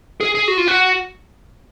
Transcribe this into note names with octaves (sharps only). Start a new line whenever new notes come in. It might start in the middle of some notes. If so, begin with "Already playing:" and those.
G#4
G#4
F#4
F4
F#4